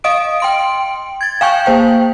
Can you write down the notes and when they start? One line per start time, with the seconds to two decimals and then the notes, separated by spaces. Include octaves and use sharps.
0.04 D#5 F5 D#6 D7
0.40 G5 C6 D7
1.21 G#6 A6
1.41 F5 G5 G#5 C#6 G6
1.66 A#3 C5 G5